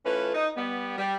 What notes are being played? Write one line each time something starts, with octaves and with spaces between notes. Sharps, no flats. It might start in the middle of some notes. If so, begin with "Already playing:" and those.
E3 A3 C#4 F4 B4
D#4
G3 B3
G3